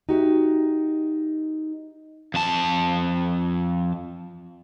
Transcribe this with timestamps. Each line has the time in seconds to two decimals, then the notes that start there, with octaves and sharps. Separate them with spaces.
0.09 D#4 F#4 G4 E5
2.34 F2 A5